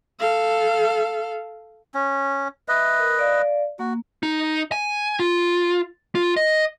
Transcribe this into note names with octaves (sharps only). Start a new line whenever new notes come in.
A4 F5
C#4
B4 D#5 E5
A#4
D5 F5
A#3 F#4
D#4
G#5
F4
F4
D#5